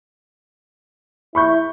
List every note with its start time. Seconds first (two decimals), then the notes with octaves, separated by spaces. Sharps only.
1.35 E4 B5 C#6 G6